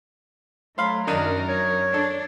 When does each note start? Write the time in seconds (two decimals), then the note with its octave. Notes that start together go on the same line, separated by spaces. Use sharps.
0.78 F#3 A3 C5 F5 B5
1.07 F#2 D#3 D4 D#4 A#4
1.48 C#5
1.94 D4 A4